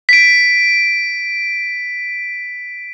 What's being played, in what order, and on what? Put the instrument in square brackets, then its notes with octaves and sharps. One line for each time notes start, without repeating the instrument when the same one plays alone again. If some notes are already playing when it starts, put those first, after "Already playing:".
[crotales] B6 D7